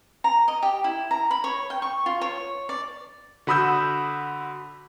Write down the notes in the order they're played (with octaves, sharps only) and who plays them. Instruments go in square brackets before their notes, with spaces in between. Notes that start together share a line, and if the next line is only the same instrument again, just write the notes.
[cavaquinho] A#5
D#5
G4
E4
A#5
B5
C#5
G5
C#6
F4
C#5
D5
[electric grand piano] D3 F#4 B5 D#6 E6 G6